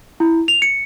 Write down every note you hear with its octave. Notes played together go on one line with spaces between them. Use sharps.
E4
F7
C#7